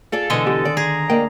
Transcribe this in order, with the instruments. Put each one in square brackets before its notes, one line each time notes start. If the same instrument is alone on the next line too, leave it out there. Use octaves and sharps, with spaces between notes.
[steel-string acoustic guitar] F4 G#4 D5 [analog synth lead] A4
[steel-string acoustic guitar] B2 E3 [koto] D3 G#3 D#5
[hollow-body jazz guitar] B3 G4
[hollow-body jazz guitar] D#3 [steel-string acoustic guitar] D5
[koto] G#4 [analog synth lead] A#5
[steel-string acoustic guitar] A#3 [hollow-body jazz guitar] D5 D#5 G5